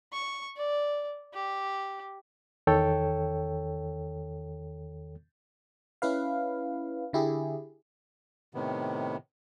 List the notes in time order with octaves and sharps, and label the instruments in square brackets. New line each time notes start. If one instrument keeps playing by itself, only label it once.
[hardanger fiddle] C#6
D5
G4
[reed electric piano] E2 D#3 A4 C#5 G5
[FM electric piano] C#4 E4 B4 F5
D3 E4 G4 G#4
[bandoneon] A2 C3 D#3 B3